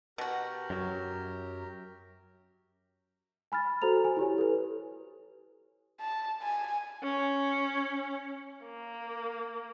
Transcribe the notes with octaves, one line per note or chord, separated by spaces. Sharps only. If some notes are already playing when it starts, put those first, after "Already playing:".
B2 F#4 G4 A#4
F#2 F#3
G#5 B5 F6 A6
F#4 A4 C5 A#5 F7
G#5
E4 G4 C#5
A4 B4
A5
G#5
C#4
A#3